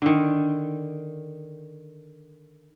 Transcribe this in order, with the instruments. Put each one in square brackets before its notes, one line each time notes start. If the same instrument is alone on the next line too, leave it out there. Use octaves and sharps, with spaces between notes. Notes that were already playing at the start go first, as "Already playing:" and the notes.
[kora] D3 D#3